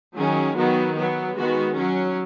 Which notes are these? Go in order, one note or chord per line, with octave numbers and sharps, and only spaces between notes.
D#3 F#3 C#4 G#4
D#3 F#3 B3 F#4
F#3 B3
D#3 G#3 B3 F#4
F#3 C#4